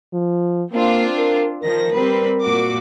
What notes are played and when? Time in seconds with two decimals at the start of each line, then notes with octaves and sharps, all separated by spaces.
0.13 F3
0.72 A#3 C4 D4 F4
1.18 A#4
1.63 D#3 F3 A#4 A#6
1.94 G3 C4 B4
2.44 A#2 F#4 D6